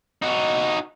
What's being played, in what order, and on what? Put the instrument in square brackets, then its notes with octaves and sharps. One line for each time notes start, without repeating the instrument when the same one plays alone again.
[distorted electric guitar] D#4 F#4